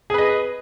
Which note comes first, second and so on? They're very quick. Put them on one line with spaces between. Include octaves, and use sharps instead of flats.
G#4 B4 D#5